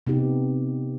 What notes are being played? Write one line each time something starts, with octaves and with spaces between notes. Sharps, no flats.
C3 B3 D#4 G4